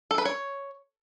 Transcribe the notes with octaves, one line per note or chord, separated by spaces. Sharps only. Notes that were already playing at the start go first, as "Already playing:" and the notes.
A4
B4
C#5